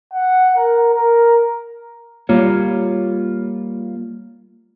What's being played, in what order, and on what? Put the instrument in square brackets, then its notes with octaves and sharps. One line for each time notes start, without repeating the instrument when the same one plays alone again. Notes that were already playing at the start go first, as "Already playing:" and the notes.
[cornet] F#5
A#4
A#4
[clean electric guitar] G3 A#3 F4 C#5